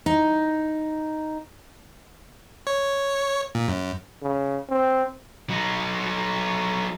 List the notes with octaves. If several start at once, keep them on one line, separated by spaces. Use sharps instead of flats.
D#4
C#5
A#2
F#2
C#3
C4
F#3 D#4